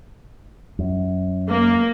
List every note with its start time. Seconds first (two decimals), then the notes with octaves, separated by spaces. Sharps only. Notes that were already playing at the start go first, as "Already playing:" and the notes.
0.79 F#2
1.49 A#3